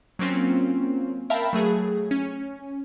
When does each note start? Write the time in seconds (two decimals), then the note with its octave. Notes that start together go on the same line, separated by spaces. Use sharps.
0.19 F#3 A#3 C4 C#4 F4
1.30 A#4 E5 F5 G5 A5 B5
1.53 F#3 A3 G#4
2.11 C#4